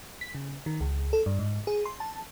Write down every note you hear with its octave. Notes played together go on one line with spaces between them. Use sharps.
B6
C#3
D#3
C#2
A4
G2
G#2
G#4
C6
A5